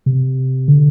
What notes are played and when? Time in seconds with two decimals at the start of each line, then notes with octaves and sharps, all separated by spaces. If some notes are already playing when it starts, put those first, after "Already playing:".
0.06 C3
0.68 D3